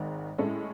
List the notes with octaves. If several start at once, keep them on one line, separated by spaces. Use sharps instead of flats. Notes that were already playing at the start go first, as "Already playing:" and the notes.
Already playing: G#1 G#2 D#3
A2 G#3 C#4 E4 A4